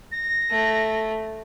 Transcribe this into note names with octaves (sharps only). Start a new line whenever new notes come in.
A#6
A3